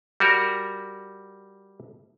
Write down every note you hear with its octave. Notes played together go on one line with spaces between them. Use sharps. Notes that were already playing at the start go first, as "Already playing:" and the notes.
G3 F#4 A#4